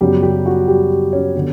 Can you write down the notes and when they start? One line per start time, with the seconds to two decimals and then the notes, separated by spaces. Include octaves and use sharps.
0.01 F#2 C#3 F#3 G3 B3 G4
0.23 G3 G4
0.46 F#4
0.68 G3 G4
1.13 C#4 C#5
1.35 D3 G3 B3